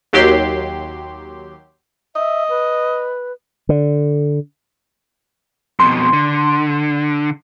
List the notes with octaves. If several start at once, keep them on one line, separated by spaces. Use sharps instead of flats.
D#2 F#3 G4 C6
D#5 E5
B4
D3
F2 B2 C6
D3